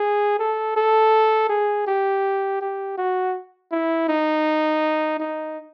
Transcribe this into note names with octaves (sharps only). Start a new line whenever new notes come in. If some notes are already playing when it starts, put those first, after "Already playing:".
Already playing: G#4
A4
A4
G#4
G4
G4
F#4
E4
D#4
D#4